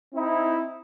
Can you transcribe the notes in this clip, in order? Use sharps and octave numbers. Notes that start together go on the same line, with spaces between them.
C4 D#4 E4